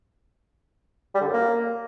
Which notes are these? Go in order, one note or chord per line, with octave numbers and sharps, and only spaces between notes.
G3
D3
F#2
A#3